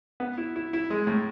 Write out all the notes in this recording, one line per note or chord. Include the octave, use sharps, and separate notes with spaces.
B3
E4
E4
E4
G#3
A2